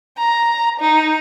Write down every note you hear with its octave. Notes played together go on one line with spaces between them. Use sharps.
A#5
D#4